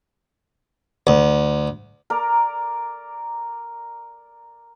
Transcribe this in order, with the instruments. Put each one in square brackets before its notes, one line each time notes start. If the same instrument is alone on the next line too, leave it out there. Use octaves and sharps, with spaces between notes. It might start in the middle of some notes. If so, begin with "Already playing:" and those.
[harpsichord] D2
[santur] A#4 D5 A#5